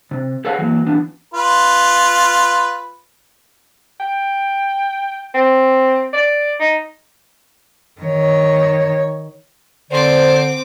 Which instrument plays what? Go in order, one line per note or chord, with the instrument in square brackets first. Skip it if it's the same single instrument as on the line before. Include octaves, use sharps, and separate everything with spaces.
[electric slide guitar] C3
G#4 A4 B4 C#5 F5 F#5
E3 F#3 A#3
E3 B3 D4
[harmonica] F4 B4
[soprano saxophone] G5
C4
D5
D#4
[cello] D#3 C#5
[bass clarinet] D3 [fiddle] C4 D6 [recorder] C5 [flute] D5